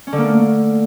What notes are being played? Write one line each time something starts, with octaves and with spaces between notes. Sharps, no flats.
C#4
D3
A#3
A3